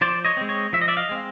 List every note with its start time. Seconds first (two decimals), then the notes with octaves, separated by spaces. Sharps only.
0.01 F3 C5 D5
0.25 C#5 D#5
0.37 G#3 C4
0.49 C#5 D#5
0.73 F3 E5
0.81 D#5
0.88 D5 E5
0.97 D#5 F5
1.09 G#3 C4